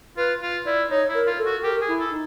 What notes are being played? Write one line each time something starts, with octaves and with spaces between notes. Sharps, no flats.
F4 B4
F4
E4 D5
D#4 C#5
E4
A#4
F4
A4
F#4
G4 A#4
G#4
E4
A4
D#4